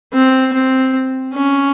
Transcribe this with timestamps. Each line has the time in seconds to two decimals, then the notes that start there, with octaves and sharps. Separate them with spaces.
0.13 C4
0.53 C4
1.34 C#4